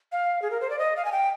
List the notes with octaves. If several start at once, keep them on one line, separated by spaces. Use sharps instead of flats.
F5
G#4
A#4
C5
D5
D#5
F5
G#5
G5